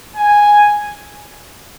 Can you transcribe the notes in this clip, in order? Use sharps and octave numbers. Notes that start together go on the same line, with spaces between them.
G#5